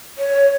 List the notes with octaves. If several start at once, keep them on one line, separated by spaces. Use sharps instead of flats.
C#5